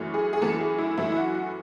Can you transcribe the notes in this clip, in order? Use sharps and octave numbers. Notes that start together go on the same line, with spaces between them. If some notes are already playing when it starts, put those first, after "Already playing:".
Already playing: F#2 E3 A3
G#4
G#4
F#2 E3 A3 A4
G#4
E4
F#2 E3 A3 E4
E4
F#4
F#4